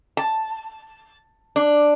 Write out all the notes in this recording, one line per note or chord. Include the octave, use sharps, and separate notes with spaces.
A5
D4